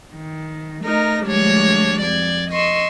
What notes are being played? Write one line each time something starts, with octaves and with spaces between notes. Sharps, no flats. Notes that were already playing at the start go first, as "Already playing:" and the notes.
D#3
A3 D#4 A#4 A#6
D2 F3 G3 G#3 D4 C#5
F2 D5 G#6
D#5 C6 C#6 E6